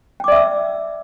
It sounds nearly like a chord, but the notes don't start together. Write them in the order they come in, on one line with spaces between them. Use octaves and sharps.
G5 D6 D5 E5 E6